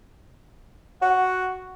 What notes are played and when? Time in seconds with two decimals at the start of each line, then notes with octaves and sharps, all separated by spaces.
1.02 F#4 F#5